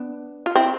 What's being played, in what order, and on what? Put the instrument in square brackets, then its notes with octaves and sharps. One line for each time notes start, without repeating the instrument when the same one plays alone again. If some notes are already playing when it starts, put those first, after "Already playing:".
Already playing: [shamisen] B3 D4
F4
C4 E4